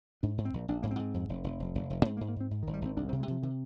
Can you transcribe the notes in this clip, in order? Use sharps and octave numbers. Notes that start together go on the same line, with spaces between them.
G#2 D4
G#2
C4
A#1
A#1 D4
G#2 A#3
C4
G#2
F2
F1
F1
F1
F1
F1
G#2 C4
A#3
G#2
A#3
G#2 C4
G#2
D#3
G#1
G3
G#1 C4
C2 D4
C4
C3
G#3
C3 F3
C3 D#3